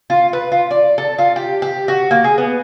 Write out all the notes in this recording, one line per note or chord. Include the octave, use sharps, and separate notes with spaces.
F4
B4
F4
D5
A4
F4
G4
G4
F#4
A#3
G#4
B3